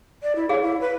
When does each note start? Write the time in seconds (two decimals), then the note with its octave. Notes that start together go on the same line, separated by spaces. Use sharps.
0.23 D5
0.36 E4
0.49 G#4 C#5 F5
0.62 E4
0.81 B4